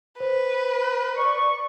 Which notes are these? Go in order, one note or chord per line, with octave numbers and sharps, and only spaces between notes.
B4 C5
D5 C#6